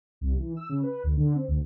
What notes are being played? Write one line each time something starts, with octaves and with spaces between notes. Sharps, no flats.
C2
E3
E6
C#3
B4
D2
D3
C4
D2